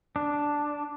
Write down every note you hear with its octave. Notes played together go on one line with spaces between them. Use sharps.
D4